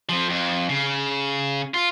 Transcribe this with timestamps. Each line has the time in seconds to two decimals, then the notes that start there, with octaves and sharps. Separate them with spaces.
0.09 F3 C4
0.30 F2
0.69 C#3
1.74 F4